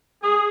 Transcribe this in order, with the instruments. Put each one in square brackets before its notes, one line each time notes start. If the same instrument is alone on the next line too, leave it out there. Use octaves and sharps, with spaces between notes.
[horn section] G#4